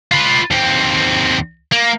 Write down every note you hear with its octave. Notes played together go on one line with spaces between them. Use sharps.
F4 B4
D#2 C4
A#3